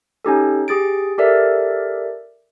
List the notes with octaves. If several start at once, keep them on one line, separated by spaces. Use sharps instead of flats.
C#4 D#4 G4 A4
G4 G#4 A6 D7
G4 A4 A#4 D5 E5